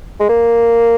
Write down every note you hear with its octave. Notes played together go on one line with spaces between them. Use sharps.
G#3
A#3